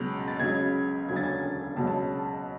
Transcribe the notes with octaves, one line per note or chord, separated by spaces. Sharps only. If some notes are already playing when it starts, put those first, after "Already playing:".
Already playing: C#2 B2 F#3
A6
C#2 C#3 F#3 G#6
E1 D2 C#3 F#3 G#6
A6
G#6
C#2 B2 F#3 A5
A5